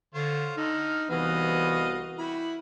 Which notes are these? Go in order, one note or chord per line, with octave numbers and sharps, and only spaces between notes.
D3 F4 C5 C#5
D3 D#4 F#4 F6
C2 E3 B3 F#4 B4 D#5 F5
E4 F#4 G4 B5